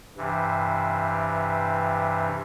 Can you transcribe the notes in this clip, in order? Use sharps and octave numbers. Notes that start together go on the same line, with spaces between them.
G2 C3 E3